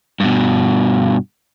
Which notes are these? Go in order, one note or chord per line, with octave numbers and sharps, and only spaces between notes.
G2 B2